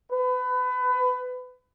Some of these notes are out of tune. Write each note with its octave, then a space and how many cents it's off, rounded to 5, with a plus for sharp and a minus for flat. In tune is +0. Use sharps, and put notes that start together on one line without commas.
B4 +25